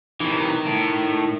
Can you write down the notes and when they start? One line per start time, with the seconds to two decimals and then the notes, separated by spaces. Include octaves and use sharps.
0.20 C3 E3 D#4 A#4
0.66 A2